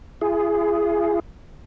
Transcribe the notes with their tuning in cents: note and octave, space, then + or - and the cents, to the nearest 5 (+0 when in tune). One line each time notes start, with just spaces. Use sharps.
E4 +45 G#4 +0